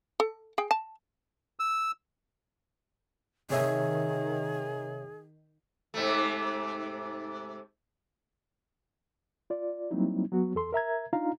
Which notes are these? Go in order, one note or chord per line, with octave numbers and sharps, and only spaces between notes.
A4
G#4 G5
A5
E6
C3 D#3 G#4 C#5 E5
G#2 C3 A3
F4 D5
F#3 G3 A#3 C4 D#4 E4
F#3 B3 F#4
E2 A4 C6
A#4 E5 A#5 G#6
D4 D#4 F4 F5 A#5